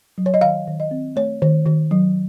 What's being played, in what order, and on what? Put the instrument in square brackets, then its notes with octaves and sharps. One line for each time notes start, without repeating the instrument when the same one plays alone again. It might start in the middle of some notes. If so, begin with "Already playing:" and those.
[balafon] F#3
C#5
D#5
D#3 F5
D#3
D#5
C4
A3 C#5
D#3
D#3
F#3